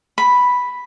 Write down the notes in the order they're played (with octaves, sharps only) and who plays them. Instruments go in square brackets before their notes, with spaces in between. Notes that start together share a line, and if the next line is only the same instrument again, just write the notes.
[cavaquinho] B5